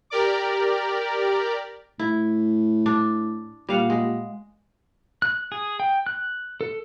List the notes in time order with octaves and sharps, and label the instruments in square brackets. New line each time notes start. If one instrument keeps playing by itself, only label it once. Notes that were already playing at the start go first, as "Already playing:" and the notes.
[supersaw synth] G4 A#4 D5 D6
[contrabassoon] A2 [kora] E4
[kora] D4
[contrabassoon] A#2 [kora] G3 F5 F#5
[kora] G#3
[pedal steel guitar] F#6
G#4
G5
F#6
A4